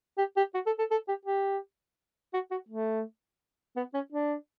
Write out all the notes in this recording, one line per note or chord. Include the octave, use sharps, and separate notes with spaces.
G4
G4
F#4
A4
A4
A4
G4
G4
F#4
F#4
A3
B3
C#4
D4